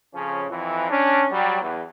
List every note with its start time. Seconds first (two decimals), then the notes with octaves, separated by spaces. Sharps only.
0.14 F2 C#3 F3 C#4
0.49 F2 E3
0.90 C#4 D4
1.31 F#3 G3
1.62 E2